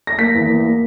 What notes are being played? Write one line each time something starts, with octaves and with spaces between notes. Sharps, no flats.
A#6
A#3 B6
E2
A#3
A#3